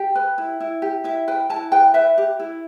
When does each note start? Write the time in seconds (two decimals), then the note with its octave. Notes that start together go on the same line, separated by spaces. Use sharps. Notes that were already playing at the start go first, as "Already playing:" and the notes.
Already playing: G4 G5
0.15 B4
0.38 E4
0.60 E4
0.82 G4
1.04 E4 E5
1.28 B4 G5
1.50 E4 A5
1.72 B4 G5
1.94 B4 E5
2.18 G4
2.40 E4